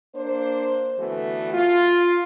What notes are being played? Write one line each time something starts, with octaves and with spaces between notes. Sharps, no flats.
A#3 D4 C5
D3 E3 A3 B3 F#4
F4